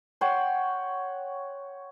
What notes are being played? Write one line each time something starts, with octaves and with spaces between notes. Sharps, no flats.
C#5 F#5 G5 C6